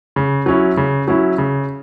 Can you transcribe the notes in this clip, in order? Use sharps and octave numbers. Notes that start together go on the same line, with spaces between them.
C#3
F#3 C#4 E4
C#3
F#3 C#4 E4
C#3